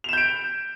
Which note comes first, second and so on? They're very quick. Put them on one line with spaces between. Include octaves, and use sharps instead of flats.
F7 E7 G6 D7